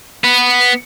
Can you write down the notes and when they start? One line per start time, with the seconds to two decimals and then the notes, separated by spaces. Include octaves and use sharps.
0.24 B3